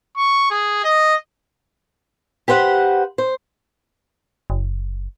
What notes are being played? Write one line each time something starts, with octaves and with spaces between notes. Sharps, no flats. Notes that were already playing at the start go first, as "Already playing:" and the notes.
C#6
G#4
D#5
G4 B4 C5 F#5
C5
F#1